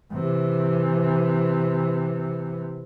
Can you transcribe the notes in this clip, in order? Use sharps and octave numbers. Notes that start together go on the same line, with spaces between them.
C3 E3